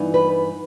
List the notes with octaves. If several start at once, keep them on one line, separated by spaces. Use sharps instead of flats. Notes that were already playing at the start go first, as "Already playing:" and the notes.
Already playing: G2 E3 B3 D#4
B4